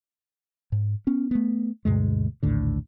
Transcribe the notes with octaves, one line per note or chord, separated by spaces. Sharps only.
G#2
B3 C#4
A3 B3
D2 G2 B2 G#3
A#1 D#2 A2 D3